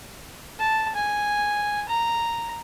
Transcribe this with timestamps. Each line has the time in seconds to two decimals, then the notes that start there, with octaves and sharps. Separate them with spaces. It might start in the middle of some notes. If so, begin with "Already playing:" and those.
0.59 A5
0.95 G#5
1.89 A#5